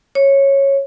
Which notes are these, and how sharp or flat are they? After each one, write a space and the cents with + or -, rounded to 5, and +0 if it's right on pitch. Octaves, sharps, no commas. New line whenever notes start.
C#5 -10